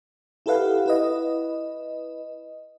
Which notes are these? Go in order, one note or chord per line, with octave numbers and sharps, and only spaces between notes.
E4 G4 A4 B4 F5 F#5
E4 B4 D#5